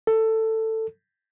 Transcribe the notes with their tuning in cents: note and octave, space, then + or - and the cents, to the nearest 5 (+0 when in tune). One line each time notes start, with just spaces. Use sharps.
A4 +15